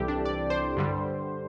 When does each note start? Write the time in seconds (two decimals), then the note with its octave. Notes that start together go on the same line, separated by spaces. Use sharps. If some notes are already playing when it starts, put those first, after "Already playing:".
Already playing: C2 C3 E3 G3 G4 A4
0.08 D4
0.25 D5
0.50 C5
0.77 G2 D3 G3